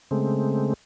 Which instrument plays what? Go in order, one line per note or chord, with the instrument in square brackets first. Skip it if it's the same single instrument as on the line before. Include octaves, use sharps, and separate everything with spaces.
[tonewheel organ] C#3 G#3 A3 C4